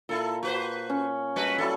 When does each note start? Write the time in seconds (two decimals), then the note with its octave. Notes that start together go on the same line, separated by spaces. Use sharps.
0.09 A#2 E4 A4
0.43 F#4 B4 C5
0.90 C#4
1.36 G3 F#4 B4
1.58 F#3 G3 E4 A4